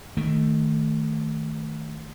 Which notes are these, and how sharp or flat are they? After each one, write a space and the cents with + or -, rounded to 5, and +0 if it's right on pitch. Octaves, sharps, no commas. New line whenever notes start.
D#3 +0 A3 +5